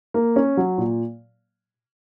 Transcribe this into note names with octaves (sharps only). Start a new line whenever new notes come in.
A#3
C#4
F#3
A#2